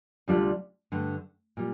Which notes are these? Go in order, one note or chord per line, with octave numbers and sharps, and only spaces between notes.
D2 C3 G3 D4 F4
G2 D3 A3
A#2 G3